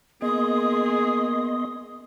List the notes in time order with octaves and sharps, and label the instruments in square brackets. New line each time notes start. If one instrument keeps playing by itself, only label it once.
[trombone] A#3 [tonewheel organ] B3 D#5 C6 [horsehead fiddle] G#4 [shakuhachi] D#6